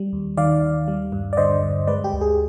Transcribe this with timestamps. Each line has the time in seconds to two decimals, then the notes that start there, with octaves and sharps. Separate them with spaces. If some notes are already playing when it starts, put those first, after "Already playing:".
Already playing: G3
0.13 D#2
0.37 D#3 D5 F5
0.62 D#2
0.88 G3
1.12 G2
1.33 D5
1.37 D3 C5 D#5
1.63 G2
1.87 G#3 B4 D5
2.04 G4
2.13 D2
2.21 G#4